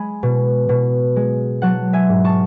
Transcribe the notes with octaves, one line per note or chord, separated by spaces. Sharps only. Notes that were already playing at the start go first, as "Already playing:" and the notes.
Already playing: G#3 G#5 B5
B2
B2
G#3
F#3 F#5 A5
E5 G#5
G#2
A5 C#6